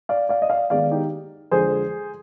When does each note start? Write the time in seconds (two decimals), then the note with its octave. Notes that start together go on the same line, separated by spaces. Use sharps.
0.09 D5 F5
0.29 D5 F5
0.42 D#5
0.50 D5 F5
0.70 D#2 D#3 G#3 B3 D5 F5
0.91 D#4 G4
1.51 F2 D3 F3 G#3 G#4 C5